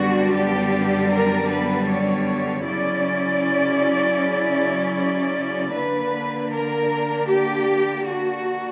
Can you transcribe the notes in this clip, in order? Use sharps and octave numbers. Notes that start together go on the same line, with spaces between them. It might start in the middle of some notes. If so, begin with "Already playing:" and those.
Already playing: F#2 D3 G3 B3 D4 F#4
G4
A#4
B4
C#5
C#3 F#3 C#4 E4 D5
D5
D3 A#3 D4 B4
A#4
G4
F#4